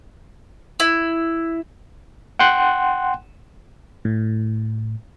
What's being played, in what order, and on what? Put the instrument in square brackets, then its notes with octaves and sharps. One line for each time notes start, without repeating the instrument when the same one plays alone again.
[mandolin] E4
[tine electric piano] F#5 G5 C6 F#6
[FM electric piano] A2